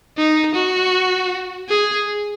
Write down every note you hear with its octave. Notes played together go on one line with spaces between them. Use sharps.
D#4
F#4
G#4